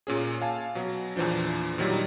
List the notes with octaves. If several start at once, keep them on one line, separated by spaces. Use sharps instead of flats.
A#2 C#4 G#4
F5 G#5 A5
B2 F#3
E2 A#2 E3 F3 D4
A#2 D#3 F#3 G3